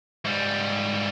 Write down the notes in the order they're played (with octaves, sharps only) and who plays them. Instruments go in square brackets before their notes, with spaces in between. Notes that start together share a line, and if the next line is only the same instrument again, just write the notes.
[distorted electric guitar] G#2 G3